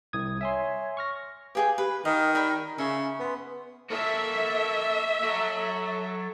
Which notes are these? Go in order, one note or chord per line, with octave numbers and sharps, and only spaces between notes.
C2 D#6 G#6
C#5 E5 G#5 C6
C#6 F6 A#6
G4 G#4 B4 F5 G5
G4 B4
D#3 D#5 F5 F6
A#4 D5 G5 B5
C#3 E5 G#5 C#6
B3 B4 G#5 C6
A#3 F#4 A4 E5
F#3 F#4 A4